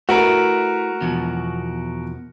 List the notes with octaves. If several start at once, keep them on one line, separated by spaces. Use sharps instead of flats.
A3 E4 F#4 A#4 B4 A#5
E2 B2 F3